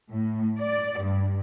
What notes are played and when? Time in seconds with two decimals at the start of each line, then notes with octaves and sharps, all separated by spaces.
0.11 A2
0.60 D5
1.03 G2